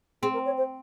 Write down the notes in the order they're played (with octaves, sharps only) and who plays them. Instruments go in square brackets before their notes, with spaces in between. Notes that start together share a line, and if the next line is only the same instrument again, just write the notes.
[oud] C4 [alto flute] G#4
[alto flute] A#4
C#5
C5